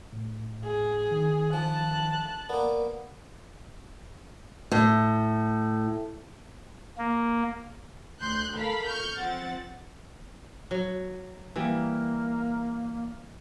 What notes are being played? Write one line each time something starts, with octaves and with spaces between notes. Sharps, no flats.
A2
G#4
D#3
F3 A5 F#6
A#3 B3 A#4 D5
A2
A#3
D2 C6 F#6 G6
A4 A#4 F5 B5
C#6 F6 G6
F3 C4 F#5 A6
F#3
E3 G3 A#3